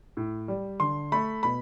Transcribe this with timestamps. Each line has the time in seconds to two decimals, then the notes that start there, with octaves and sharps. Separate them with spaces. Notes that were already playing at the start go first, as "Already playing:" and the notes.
0.17 A2
0.48 G3
0.80 D3 C6
1.12 A3 B5
1.43 B2 B5